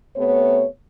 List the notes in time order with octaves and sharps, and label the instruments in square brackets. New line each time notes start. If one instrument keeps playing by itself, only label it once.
[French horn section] C3 A3 B3 C#5